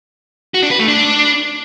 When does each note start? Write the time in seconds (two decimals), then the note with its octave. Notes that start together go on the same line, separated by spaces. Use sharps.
0.54 F#4
0.63 D4
0.71 B4
0.79 A3
0.88 D4